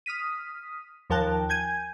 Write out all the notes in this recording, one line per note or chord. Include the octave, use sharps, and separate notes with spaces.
D#6 F6 B6 D#7
D#2 F3 A#4 G5 A5 F#6
G#5 G6 G#6 D#7